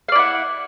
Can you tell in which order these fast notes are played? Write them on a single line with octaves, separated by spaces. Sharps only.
F5 D5 E4 F#5